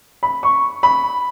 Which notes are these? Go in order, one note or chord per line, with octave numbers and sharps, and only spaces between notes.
B5
C#6
B5